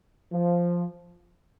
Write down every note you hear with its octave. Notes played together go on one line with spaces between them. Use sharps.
F3